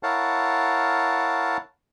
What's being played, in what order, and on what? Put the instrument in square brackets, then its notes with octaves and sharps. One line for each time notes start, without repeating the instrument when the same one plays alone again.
[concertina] E4 A#4 C#5 F5 F#5 A5